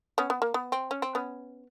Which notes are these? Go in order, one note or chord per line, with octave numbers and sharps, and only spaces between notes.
B3 C#4
B3
A#3
B3
C4
C#4
C4
B3 C#4